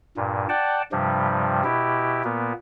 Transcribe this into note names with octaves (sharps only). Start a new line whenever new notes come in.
G2 A#2
D5 F#5 G5 A5
G2 C3 F3 G3
B2 E4 G4
A#2 A#3 B3